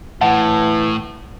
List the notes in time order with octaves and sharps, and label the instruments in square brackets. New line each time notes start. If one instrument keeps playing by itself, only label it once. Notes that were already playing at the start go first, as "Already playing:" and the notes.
[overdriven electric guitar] A2 [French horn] E3 [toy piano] F#5 [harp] A5